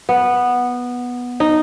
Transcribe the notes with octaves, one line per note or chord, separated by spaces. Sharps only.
B3
D#4